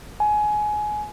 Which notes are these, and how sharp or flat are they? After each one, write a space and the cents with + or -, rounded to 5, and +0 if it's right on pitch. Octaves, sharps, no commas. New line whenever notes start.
G#5 +20